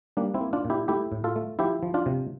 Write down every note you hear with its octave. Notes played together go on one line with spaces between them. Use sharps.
G3 A#3 D4
C4 E4
A#3
D4 F4
A#2
E4 G4
A3 E4 G4
A2
F4 A4
A3
F3 E4 G4
F3
D4 F4
C3